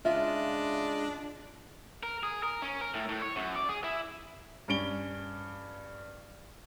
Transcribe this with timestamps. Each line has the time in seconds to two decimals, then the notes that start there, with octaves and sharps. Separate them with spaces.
0.05 C#3 G#3 D4 F4 D#5 E5
2.03 A#4
2.23 G#4
2.43 A#4
2.62 C#4
2.81 A#4
2.94 A2
3.09 A2
3.22 C#5
3.36 F#2
3.56 D5
3.69 G#4
3.84 E4
4.68 G2 C#4 D7 G7